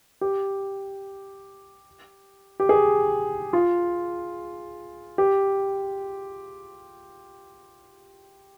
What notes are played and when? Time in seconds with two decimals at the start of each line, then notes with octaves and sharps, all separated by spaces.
0.21 G4
2.60 G4
2.69 G#4
3.53 F4
5.18 G4